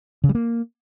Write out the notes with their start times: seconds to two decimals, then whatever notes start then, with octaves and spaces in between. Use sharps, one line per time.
0.24 C#3
0.29 G3
0.35 A#3